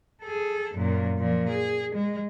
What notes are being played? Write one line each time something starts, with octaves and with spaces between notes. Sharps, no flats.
G#4 A4
F#2 A#2
A#2 F3
G#4
G#3